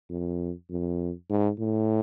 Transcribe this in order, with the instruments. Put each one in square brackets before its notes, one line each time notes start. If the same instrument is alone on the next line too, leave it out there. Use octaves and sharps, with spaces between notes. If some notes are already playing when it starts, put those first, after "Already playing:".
[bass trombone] F2
F2
G#2
A2